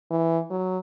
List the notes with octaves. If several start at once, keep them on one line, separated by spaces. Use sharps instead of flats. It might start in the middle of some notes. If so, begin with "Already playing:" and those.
E3
F#3